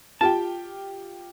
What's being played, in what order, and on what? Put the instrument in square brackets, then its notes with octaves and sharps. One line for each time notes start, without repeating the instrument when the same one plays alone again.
[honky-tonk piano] F4 G4 G5 [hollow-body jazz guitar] A5